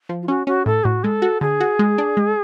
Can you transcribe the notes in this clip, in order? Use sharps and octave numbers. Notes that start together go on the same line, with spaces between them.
F3
F4
C#4 F#4
C#4 F#4
A2 A4
A2 F#4
G#3 A4
F#4
D3 G#4
F#4
G#3
D4
G#3